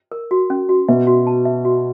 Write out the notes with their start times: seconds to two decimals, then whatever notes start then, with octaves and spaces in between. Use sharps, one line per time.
0.12 A#4
0.31 F#4
0.50 C#4
0.69 F#4
0.88 B2 E5
1.07 F#4
1.27 A5
1.45 E5
1.65 F#4